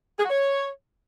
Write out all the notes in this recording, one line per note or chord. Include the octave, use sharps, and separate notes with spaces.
G#4
F#4
C#5